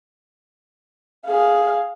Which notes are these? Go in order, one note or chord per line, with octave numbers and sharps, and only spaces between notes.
G#4 F5